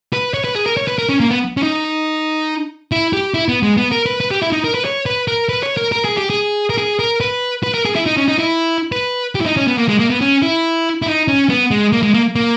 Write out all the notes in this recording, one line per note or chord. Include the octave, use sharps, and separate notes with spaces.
B4
C#5
B4
G#4
A#4
C#5
B4
A#4
C#4
A#3
B3
C#4
D#4
E4
G4
E4
B3
G#3
B3
A#4
B4
B4
G4
E4
D#4
A#4
B4
C#5
B4
A#4
B4
C#5
A#4
A#4
G#4
G4
G#4
A#4
G#4
A#4
B4
B4
A#4
G#4
E4
D#4
C#4
D#4
E4
B4
G4
E4
D#4
C#4
B3
A#3
G#3
A#3
B3
C#4
E4
E4
D#4
C#4
B3
G#3
A#3
G#3
A#3
A#3